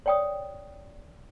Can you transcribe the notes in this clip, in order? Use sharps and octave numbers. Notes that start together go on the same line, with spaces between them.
C#5 D5 G5 C#6 D#6